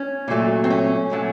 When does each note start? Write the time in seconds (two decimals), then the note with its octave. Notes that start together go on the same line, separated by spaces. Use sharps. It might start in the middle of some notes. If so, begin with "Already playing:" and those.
Already playing: C#4
0.28 A#2 F#3 A3
0.64 C4
0.70 C#4
1.11 A#2 F#3 A3